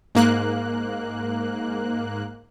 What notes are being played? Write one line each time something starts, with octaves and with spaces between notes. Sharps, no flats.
G#2 A#3 F#6